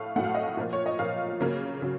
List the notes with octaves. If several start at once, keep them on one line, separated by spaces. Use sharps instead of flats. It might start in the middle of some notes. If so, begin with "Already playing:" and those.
Already playing: A2 A3 F5
A2 F#3 A3 F#5
F5
D#5
F5
A#2 F3 A#3
C#5
D#5
A#2 F3 A#3 F5
C#3 F#3 A#3
C#3 F#3